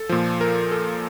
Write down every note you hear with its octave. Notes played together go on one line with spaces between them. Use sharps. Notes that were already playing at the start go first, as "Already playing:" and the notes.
Already playing: A4
A#2 F3
A#4
A4